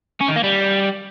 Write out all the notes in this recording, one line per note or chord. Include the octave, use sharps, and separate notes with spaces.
C#4
D#3
A#3
G3